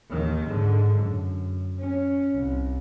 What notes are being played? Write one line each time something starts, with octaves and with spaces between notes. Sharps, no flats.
D#2 D#3
G#2 D3
F#2
C#4
C2